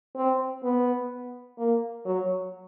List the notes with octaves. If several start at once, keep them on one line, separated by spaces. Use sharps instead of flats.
C4
B3
A#3
F#3